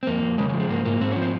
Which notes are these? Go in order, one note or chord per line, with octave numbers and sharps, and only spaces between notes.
C4
F2 A#3
F2
C#3 G#3
G#3
F3
G#3
G#2 A#3
G#2 A#3
G#2 C4
C#4
F3
C4